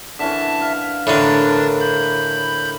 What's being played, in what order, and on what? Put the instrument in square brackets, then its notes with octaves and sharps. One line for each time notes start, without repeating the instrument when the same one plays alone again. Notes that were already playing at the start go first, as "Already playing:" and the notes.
[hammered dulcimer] D3 E3 C#4 [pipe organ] E5 A5
[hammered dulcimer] F5
[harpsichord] A2 D3 [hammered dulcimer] E3 A#4 B4 [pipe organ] D4 A6
[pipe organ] B5 G6